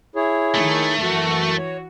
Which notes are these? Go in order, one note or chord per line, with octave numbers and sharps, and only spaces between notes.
E4 G#4 C#5
D#3 A3
F#2 E3 F#4
C#5